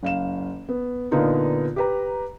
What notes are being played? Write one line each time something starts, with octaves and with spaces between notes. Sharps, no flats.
F#1 F5 E7
B3
A#2 D3 B3 D#4 F4 A#4
G4 B4 A#5